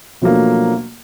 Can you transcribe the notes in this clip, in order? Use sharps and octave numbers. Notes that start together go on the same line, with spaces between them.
B2 F3 F#3 A3 A#3 D4